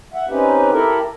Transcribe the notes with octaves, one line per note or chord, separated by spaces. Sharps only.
E5 F#5
C4 C#4 D#4 G4 B4
E4 G4 A4 A#4